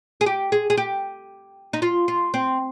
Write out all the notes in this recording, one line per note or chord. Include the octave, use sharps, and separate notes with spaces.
G#4
G4
G#4
G#4
G4
D#4
F4
F4
C4